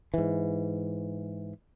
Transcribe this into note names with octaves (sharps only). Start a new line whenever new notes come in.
G#2 E3